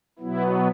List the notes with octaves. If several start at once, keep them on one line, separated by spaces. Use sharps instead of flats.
B2 F#3 B3 E4